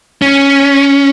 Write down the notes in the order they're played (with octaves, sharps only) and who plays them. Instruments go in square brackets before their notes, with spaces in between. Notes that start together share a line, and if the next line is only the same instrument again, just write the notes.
[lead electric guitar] C#4